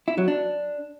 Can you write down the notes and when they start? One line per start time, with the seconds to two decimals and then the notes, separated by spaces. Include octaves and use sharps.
0.08 E4
0.18 F#3
0.28 D4